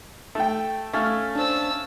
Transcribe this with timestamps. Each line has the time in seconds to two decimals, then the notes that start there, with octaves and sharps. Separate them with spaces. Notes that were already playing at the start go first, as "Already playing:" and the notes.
0.35 A3 G5
0.93 A3 C#4 F5
1.35 D4 C5 A5 E6